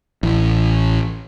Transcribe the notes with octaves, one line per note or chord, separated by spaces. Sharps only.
A1